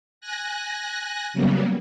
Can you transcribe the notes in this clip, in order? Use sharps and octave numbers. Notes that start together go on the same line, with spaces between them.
G#5 F#6 A#6
C#3 F#3 G3 A#3 B3